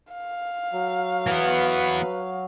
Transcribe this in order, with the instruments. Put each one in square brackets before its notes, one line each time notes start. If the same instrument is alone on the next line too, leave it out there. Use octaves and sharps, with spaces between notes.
[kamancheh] F5
[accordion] F#3
[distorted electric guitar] E3 B3 [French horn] B4